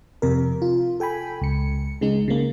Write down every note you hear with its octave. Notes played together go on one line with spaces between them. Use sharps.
F2 C3 A#4
F4
A4 G5 G#5 B5
C#2 C#7
C#3 G#3 D#4
C#3 A#3